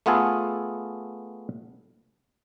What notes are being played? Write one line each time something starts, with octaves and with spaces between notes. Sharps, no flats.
A3 B3 F4 G#4 A4